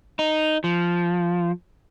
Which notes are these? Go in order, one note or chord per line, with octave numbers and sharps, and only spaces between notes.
D#4
F3